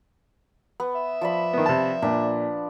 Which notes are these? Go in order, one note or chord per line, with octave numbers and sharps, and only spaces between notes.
B3
E5
F3 D5 B5
D#3 B3
C3 A5
A#2 D4 A5